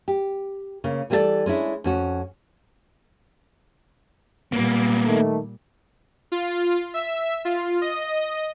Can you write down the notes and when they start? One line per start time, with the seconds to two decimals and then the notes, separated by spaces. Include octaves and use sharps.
0.08 G4
0.84 C#3 A#3
1.10 E3 G3 B3 E4 A4 D5
1.46 G#3 C#4 D4 E4
1.84 F2 C#4 F#4
4.52 A#2 G3 A#3 B3
5.06 D#3 A3
6.32 F4
6.94 E5
7.45 F4
7.82 D#5